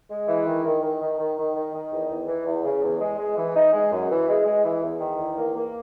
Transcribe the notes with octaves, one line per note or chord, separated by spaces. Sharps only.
G#3
E3
D#3
D#3
D#3
D#3
D#3
D#3
D#3
D#3
E2
E2
E3
E2
C#3
E2
G#3
G#3
E3
D#4
G#3
F#2
E3
G#3
G#3
E3
E2
D#3
E2
A#3
A#3